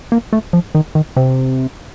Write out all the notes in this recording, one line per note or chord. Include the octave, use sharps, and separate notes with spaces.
A#3
A3
F3
D#3
D#3
C3